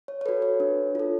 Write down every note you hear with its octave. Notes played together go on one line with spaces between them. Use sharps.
C#5
C#5
F#4 A4 B4
C#5
D4
F4 A4